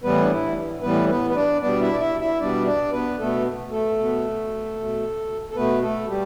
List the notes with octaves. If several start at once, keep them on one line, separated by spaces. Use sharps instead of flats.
A2 E3 G3 B3 B4
D4
E4
A2 E3 G3 B3 B4
B3 B4
B4
D4 D5
B2 G3 B3 D4 D5
E4 E5
D5
E4 E5
E4 E5
B2 G3 B3 D4 D5
D4 D5
B3 B4
B2 A3 B3 A4
A3 A4
B2 B3
B2 A3
A4
B2 A3 B3 B4
A3 A4
G3 G4